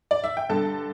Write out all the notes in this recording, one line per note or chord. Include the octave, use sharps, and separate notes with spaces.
D5
E5
G5
G2 D3 A4 A5